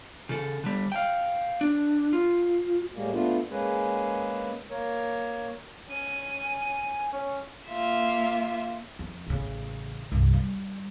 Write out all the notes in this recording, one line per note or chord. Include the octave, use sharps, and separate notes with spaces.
C#3 A4
D3 G3
F5 G5
D4
F4
A2 G3 G#3 A#3
A3 B3 D4 F4
G#3 A#3 C#4 G#4 B4
A#3 A#4 C#5
C#4 D#7
G#5
C#4
A#3 F4 E5
F2
A1 C#3
C2 G2
G3